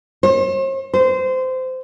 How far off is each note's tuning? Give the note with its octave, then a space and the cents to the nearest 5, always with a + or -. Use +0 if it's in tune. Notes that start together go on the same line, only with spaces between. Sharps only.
C5 +45
C5 -20